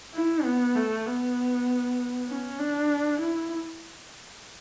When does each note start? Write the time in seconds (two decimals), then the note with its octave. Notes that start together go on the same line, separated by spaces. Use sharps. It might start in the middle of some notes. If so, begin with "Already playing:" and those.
0.14 E4
0.44 B3
0.75 A3
1.06 B3
2.28 C#4
2.59 D4
3.20 E4